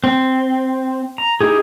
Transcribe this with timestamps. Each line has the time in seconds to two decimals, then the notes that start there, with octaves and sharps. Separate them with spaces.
0.04 C4
1.18 A#5
1.41 D#4 E4 G4 G#4